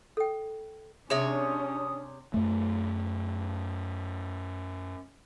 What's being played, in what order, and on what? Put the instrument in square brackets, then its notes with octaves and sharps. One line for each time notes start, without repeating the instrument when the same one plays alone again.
[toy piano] A4 G5
[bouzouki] C3 C#5 [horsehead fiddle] C#4 D4 [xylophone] G#4 E5 [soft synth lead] D#6
[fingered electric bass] F#2 A3